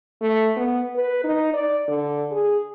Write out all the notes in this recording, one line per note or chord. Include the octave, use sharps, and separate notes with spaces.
A3
B3
B4
D#4
D5
D3
G#4